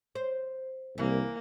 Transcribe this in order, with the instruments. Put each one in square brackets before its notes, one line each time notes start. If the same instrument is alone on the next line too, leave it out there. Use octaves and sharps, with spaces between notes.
[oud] C5
[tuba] C2 [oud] E3 [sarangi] A#3